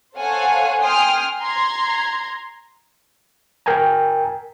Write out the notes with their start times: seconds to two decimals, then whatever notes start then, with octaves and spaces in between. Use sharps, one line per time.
0.17 A4 C5 C#5 F5 F#5 G#5
0.80 G5 G#5 C6 D#6 F6
1.41 A#5 C6 G#6
3.66 A#4 G5 G#5 A#5